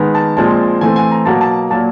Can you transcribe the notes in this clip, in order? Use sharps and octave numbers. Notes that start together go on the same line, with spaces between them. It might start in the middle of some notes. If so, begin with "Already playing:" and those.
Already playing: D#3 G#3 B3
A5
A#2 F3 G#3 C4 A5
E3 A3 C4 G#5
G#5
A#5
B2 F#3 A#3 A5
A5
A#2 F#3 A#3 A5